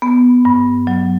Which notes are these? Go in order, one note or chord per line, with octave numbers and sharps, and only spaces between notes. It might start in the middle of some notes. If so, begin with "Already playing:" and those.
B3
G2
F#3